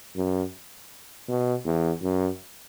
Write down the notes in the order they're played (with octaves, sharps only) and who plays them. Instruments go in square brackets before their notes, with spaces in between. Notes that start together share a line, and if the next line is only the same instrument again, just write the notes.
[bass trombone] F#2
B2
E2
F#2